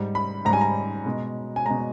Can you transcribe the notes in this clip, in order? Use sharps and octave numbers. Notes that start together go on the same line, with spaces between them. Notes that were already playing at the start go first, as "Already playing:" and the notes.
Already playing: G#2 G3
B5
G#2 G3 G#5 A#5
A#5
B2 G#3
G#5
B2 G#3 A#5